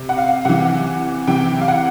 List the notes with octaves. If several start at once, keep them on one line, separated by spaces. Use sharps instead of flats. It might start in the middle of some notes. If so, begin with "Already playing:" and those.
Already playing: C3
F#5
F5
C3 E3 F#5
C3 E3 G5
F5
F#5